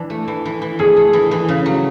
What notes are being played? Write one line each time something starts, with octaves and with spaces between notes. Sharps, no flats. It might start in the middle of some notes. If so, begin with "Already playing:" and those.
Already playing: E3 D4
A3
E3
E3
E3
A3 G#4
A3
E3
E3
C#3
F#3